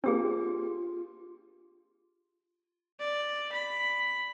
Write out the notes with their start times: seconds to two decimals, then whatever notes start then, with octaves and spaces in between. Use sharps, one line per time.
0.04 A#3 C4 D4 F4 G4 G#4
2.99 D5
3.52 B5